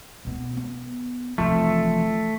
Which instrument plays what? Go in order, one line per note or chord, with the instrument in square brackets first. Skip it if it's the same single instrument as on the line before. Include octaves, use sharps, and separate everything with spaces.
[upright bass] B2 B3
B3
[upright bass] F1 E3 [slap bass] F3 [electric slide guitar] A3